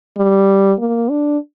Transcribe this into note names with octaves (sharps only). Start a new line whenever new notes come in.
G3
A#3
D4